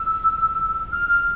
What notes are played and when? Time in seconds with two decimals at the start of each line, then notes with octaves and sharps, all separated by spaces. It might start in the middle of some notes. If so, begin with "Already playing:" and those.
Already playing: E6
0.92 F6
1.09 F6